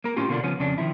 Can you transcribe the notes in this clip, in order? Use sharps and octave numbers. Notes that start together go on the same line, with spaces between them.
A#3 A#4
A2 C#4 F4 G4
B2 D3 A#3 C4 D4 F4
C#3 F3 B3 C#4
F2 C#3 D4
D#3 F3 E4